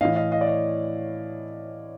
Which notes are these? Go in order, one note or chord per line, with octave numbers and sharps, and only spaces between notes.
A2 E3 D#5 F5
D#5 F5
D#5 F5
D5
C#5 D#5